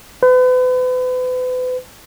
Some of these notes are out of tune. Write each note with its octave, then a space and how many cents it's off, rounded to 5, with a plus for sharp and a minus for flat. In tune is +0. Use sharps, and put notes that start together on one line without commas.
B4 +40